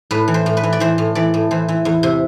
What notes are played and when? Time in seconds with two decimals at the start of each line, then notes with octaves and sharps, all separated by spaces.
0.11 A2 B4
0.28 E3
0.34 C5
0.46 A2
0.57 B4
0.63 E3
0.73 D5
0.80 E3 C5
0.98 A2
1.15 E3 D5
1.34 A2
1.51 E3 C5
1.68 E3
1.85 E2
2.03 C3